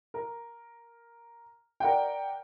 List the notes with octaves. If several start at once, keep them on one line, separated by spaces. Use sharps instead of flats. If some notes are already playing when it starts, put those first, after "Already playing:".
A#4
A#4 D5 F#5 G5